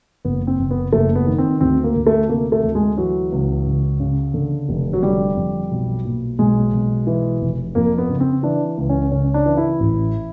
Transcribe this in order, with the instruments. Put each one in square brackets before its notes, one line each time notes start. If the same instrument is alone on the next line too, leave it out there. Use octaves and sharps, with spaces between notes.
[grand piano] F#1 B3
C4
F#1
B3
F#1 A3
B3
D#3
C4
D2 C4
A#3
D2
A3
C3 A#3
A3
D2
G#3
E3 F#3
C#2
C#3
C#3
D3
F1
F#3
D3 G3
F2
B1
A#2
B1 G#3
B1
E3
F1
F2 A#3
B3
C#3
C4
E3 D4
C#2
C#4
C#3 C#4
D4
E3
E4
A1